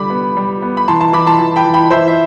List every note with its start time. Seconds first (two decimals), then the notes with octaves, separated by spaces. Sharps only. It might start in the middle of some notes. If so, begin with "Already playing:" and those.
Already playing: D3 G3 B5 D6
0.10 B3
0.37 G3
0.62 B3
0.77 B5
0.88 E3 A5 C6
1.01 A5 C6
1.13 E3 B5 D6
1.26 A5 C6
1.39 E3
1.56 G5 B5
1.65 E3
1.74 G5 B5
1.90 E3 C5 E5
2.08 E5